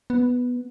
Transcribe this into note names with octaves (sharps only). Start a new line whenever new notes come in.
B3